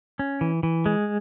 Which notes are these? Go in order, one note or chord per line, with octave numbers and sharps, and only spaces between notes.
C#4
E3
E3
G#3